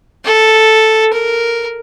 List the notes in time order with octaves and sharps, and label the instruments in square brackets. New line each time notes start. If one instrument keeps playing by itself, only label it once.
[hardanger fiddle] A4
A#4